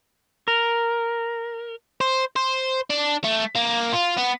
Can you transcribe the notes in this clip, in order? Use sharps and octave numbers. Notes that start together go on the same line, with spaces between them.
A#4
C5
C5
D4
A3
A#3
F4
B3